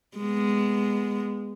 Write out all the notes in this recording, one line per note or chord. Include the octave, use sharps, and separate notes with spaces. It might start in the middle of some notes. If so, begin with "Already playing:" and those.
G#3 B3